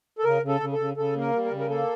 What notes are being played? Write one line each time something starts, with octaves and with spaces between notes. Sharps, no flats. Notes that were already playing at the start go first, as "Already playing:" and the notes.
A4
C#3 A#4
C#3
A4
C#3
A4
C#3
C#3 A4
A#3
A#4
G3
A#4
C#3
A#4
A#3 A4